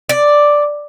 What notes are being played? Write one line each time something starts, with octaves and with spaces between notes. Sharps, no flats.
D5